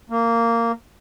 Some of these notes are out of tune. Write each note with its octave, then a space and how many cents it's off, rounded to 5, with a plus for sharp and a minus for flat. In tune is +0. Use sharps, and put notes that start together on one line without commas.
A#3 -15